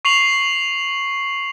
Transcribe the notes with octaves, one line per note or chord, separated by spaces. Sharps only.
C#6 C7 F7 F#7